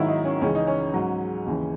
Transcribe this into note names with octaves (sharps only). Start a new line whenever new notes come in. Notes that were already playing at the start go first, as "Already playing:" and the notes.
Already playing: G#2 D#3 F#3 E4
D#4
C#4
C#2 C#3 E3 C#4
D#4
C#4
G#2 F#3
D#2 C#3 E3